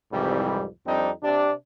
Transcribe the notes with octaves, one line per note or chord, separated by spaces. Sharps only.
C2 F2 G#2 C3 E3 G3
F2 G3 C4 D4 D#4
C3 D4